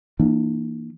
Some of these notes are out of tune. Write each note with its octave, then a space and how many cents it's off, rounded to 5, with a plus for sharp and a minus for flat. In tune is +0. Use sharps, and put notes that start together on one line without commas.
E3 +0 A#3 +0 D4 +45